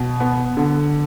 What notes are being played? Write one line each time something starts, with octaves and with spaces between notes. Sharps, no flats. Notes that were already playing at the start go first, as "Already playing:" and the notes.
Already playing: B2
B3
D3